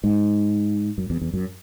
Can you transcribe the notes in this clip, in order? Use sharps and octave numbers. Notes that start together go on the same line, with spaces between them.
G#2
F#2
E2
E2
F#2